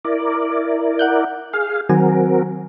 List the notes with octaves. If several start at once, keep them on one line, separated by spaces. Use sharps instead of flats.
E4 A#4 D5
F#5 F#6 G6
G#4 F5
D#3 F#3 C4 F#4 A#4 G#5